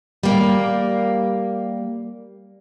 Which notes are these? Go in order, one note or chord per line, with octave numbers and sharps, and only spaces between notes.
G3 A#3